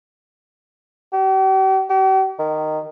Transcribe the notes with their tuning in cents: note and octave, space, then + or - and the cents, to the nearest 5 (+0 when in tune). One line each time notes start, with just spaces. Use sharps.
G4 -40
G4 -45
D#3 -10